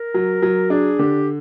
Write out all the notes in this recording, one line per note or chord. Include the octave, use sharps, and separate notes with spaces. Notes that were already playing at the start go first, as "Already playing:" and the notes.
Already playing: A#4
F#3
F#3
D4 G#4
D3 G4